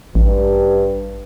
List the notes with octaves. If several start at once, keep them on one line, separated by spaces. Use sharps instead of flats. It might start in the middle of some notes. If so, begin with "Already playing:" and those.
A1 G2